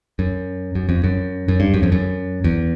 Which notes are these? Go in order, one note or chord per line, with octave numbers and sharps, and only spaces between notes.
F#2
F#2
F2
F#2
F#2
G2
F#2
F2
F#2
E2